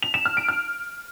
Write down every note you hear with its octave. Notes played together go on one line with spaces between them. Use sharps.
F7
E7
F6
D7
F6